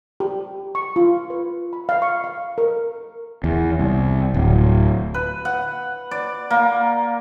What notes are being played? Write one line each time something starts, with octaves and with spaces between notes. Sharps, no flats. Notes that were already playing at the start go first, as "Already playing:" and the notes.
G4
C#6
F4
B4
B5
F5
C#6
F5
A#4
E2
C2
D1
B4
F#5
D5
A#3